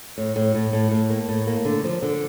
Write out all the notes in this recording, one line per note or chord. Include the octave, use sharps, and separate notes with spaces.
A2
A2
A2
A2
A2
A#3
A2
A#3
D3
F3
D3